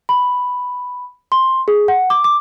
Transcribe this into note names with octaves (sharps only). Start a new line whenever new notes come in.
B5
C6
G#4
F#5
D6
D6